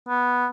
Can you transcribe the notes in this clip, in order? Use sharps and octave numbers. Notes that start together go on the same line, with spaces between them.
B3